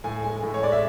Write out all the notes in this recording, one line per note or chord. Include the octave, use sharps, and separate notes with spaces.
A2 G#5
G#3 G#5
A2
C#5
G#3 D5
E5